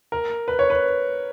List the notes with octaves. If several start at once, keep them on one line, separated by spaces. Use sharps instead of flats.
A#4
B4
C#5
B4